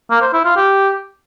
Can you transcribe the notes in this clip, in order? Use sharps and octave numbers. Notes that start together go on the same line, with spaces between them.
A#3
C5
E4
F4
G4